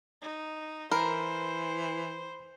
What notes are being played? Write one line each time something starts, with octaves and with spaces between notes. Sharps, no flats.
D#4
E3 A#4 C5 B5